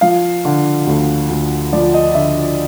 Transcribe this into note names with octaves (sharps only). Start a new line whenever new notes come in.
F3 F5
D3
D2
D2
F3 D5
D#5
D3 E5